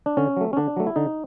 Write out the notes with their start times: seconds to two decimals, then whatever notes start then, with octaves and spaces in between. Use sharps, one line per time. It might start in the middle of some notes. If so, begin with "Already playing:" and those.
0.06 D4
0.17 D3 C#4
0.37 F#3 A3
0.53 C#4
0.57 D3 D4
0.76 F#3 A3
0.87 E4
0.96 D3 D#4